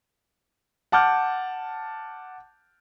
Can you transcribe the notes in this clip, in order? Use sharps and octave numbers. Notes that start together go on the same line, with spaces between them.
F#5 A5 D6 F6 G6